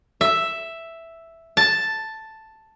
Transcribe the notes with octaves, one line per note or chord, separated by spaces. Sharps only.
E5
A5